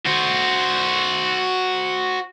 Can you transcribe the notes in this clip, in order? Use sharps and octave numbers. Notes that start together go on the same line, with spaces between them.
F#4 C5